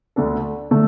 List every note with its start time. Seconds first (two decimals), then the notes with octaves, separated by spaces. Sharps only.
0.16 D2 D3 A3 D4 A4
0.71 D3 A3 D4 A4